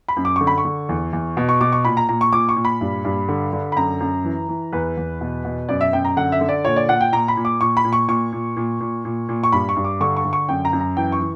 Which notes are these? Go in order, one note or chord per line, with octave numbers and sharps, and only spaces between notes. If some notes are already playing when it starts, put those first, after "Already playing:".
B5
F#2
D6
D3 C#6
B5
C#6
D3
E2
E2
B2
C#6
B2 D6
C#6
A#2 B5
A#5
A#2 A#5
C#6
A#2 D6
C#6
A#2
B5
G2
G2
D3
D3
B5
F#2 A#5
F#2
E3
E3
E2 B4
E2
B2
B2
F#2 D5
E5
F#2 G5
A#5
D3 F#5
E5
D3
D5
A#2 C#5
D5
A#2 F#5
G5
A#2 A#5
B5
A#2
D6
A#2 C#6
B5
A#2
C#6
A#2 C#6
A#2
A#2
A#2
A#2
A#2
C#6
G2 B5
C#6
G2
D6
D3 C#6
C#6
D3
C#6
F#2 G5
A#5
F#2
A#5
E3 G5
C#6
E3